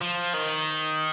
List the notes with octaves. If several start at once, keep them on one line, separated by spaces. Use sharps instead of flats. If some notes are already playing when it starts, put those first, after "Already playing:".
F3
D#3